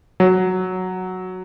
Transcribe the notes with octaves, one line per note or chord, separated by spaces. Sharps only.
F#3